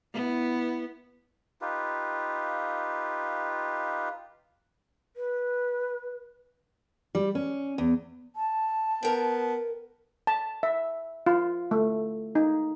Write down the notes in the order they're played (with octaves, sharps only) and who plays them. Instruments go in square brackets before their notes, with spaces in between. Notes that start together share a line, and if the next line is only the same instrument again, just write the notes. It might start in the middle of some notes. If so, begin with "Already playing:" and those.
[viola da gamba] B3 E4
[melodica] D#4 F4 G4 B4
[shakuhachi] B4
[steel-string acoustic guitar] G3
C#4
E2
[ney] A5
[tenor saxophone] B3 [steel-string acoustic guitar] A#4 G5
[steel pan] A5
E5
F4
A3
D#4